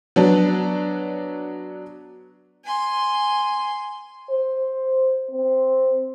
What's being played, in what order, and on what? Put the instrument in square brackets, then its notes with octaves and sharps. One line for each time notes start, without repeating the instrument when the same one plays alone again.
[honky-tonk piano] F#3 B3 D4
[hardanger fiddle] G#5 C6
[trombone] C5
C4